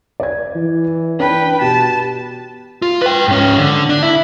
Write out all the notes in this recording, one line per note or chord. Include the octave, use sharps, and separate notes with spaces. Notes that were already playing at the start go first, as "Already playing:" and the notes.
D5 G#6
E3
D4 B4 G5
B2 G4 A5
F4
B4 G5
G#2 C#4
D3
D4
E4